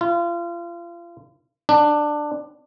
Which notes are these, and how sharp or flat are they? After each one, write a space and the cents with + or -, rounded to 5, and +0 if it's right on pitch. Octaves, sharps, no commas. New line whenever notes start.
F4 -30
D4 +15